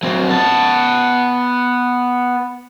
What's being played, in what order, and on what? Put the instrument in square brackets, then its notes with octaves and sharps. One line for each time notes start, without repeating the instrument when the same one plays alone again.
[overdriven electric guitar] F#3 C4
B3 A5